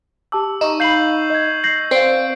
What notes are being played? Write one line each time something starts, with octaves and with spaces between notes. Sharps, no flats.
G4 A5 D6 E6
D#4 C#6 E7
F5 B5 G6 C7 F#7
D#5 G#6
G6 A#6 C7 F#7
C4 D5 F5 C7 D7